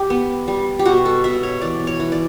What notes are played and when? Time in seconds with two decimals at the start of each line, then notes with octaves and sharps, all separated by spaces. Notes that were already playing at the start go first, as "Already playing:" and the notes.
Already playing: G4
0.10 B3
0.48 G3
0.79 G4
0.85 B2 F#4
1.06 A4
1.24 B2 E5
1.43 C#5
1.61 E3 D5
1.87 C#5
2.00 E3
2.12 D5